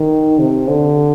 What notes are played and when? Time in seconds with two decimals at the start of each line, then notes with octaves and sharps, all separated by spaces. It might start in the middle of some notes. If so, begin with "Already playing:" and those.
Already playing: D#3
0.39 C3
0.68 D3